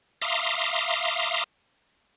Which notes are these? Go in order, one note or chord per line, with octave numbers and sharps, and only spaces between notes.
E5 F5 A#5 C6 D6 D#6